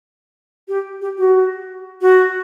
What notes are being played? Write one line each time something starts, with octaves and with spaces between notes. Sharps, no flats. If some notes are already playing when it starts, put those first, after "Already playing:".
G4
G4
F#4
F#4